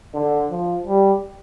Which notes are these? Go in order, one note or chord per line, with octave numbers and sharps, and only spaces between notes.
D3
F3
G3